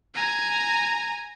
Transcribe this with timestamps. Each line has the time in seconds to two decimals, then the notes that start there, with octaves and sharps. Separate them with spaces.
0.14 G#5 A#5